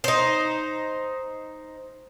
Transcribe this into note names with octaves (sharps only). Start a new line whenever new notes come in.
D#4 C5